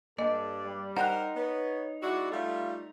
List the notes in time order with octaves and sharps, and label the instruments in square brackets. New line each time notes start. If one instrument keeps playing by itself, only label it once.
[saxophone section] G2 [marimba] A#3 D#5 [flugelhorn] A4 [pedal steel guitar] D5
[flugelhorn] G3
[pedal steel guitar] D#4 A#5 [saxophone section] A#4 C5 [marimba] F#5 G5 F#6
[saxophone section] B3 [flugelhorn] C#5
[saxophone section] G#3 E4 F#4 [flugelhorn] D5
[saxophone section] G3 A3 [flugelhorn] F4